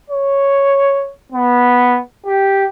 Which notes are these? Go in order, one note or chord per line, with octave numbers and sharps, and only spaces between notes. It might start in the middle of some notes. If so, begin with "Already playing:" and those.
C#5
B3
G4